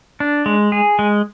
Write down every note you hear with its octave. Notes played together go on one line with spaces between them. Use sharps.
D4
G#3
G#4
G#3